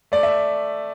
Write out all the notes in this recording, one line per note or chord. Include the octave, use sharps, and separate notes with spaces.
A3 D5
E5